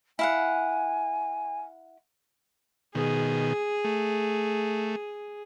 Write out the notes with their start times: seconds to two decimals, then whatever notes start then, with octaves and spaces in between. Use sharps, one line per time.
0.19 E4 F5 F#5 G#5
2.95 B2 D#3 G#4
3.85 A3